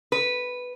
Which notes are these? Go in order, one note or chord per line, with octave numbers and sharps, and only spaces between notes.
B4